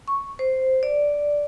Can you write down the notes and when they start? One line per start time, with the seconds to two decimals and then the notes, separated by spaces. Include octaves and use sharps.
0.08 C#6
0.39 C5
0.83 D5